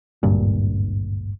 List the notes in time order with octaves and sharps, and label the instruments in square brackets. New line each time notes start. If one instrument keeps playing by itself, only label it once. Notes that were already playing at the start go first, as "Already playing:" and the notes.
[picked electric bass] G#1 D2 G2 A#2